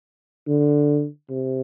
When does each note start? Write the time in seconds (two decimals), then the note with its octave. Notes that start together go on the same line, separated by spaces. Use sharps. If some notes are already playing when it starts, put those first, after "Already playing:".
0.48 D3
1.30 C3